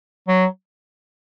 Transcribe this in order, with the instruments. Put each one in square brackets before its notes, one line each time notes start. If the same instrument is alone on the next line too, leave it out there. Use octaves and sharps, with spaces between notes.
[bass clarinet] F#3